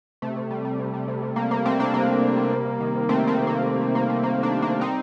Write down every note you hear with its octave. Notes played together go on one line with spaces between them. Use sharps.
C3 A3
C3
G3
G3
C3
G3
C3
C3
G3 A#3
C3 A#3
G3 A3 C4
C3 A#3 D4
C3 A#3
G3
C3
G3
C3
C3
D#3
C3
C3 A3 C4
D#3 A3 C4
C3
A#3
C3
C3
A3
C3 A#3
A3
C3 A#3
C3 A#3 D4
A3
A#3 D4
C3
G3 C4 D#4